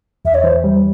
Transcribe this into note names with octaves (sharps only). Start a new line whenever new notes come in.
E2 E5
C#5
E3 C5
G3